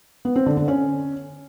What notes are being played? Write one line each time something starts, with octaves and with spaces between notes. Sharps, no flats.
B3
C4
D3
D3
C#4